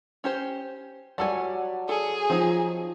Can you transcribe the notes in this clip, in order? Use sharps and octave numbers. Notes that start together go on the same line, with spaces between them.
C#4 G4 C5
F#3 G3 A4 D5 F#5 G#5 A5
G#4 A4
F3 C4 D#4